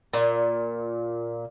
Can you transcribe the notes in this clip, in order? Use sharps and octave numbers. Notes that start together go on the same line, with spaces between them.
A#2